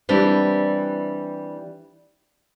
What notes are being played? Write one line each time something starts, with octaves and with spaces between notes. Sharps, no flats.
E3 G3 C4 D4